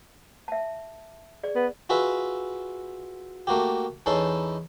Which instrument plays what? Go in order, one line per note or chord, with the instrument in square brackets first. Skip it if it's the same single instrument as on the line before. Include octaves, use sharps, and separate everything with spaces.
[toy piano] E5 A5
G#4 D5
[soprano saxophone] B3
[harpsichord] F4 F#4 G#4 B4 E5
A3 A#3 F#4 G4
E2 C#4 D#4 E4 A4 C6